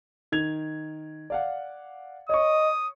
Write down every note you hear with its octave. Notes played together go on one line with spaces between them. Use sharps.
D#3 G#6 F7
D5 F5 F#5
C#5 D#5 C#6 D#6